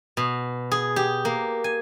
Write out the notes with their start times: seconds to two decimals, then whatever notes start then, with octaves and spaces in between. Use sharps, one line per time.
0.17 B2
0.71 G#4
0.96 G4
1.25 A#3
1.64 G#5